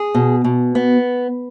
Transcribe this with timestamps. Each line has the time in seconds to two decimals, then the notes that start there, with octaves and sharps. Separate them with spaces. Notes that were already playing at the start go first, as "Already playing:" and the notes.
Already playing: G#4
0.15 B2
0.44 B2
0.75 B3